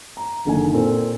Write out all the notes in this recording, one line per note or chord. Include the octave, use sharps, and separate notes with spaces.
A#5
F#1 D3 D#3 G#5
A#2 C4 A4 A#4